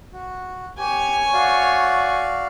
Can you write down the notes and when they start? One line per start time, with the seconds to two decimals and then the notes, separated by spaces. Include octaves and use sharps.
0.13 F#4
0.78 G4 C#5 G#5
1.33 F#4 D5 F5